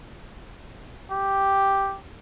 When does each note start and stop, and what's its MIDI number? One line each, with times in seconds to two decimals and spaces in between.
1.12 1.97 67